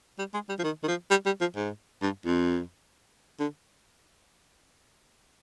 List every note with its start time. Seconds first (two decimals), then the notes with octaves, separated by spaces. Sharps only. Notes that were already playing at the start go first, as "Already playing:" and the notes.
0.19 G3
0.34 G#3
0.49 G3
0.59 F3
0.64 D#3
0.83 D#3
0.88 F3
1.10 G3
1.26 G3
1.41 F3
1.56 G#2
2.02 G2
2.26 F2
3.39 D3